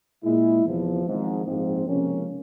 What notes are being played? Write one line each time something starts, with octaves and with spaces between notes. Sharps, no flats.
A#2 G#3 E4
E2 C3 F3
G#1 G#2 F3
A#1 G#2 F3 C4
C#2 C3 F3 A#3 C#4